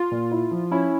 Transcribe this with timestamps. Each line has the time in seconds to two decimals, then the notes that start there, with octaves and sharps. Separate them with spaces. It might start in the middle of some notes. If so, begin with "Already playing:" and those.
Already playing: F4
0.11 A#2
0.31 E4
0.51 F3
0.71 C#4 E4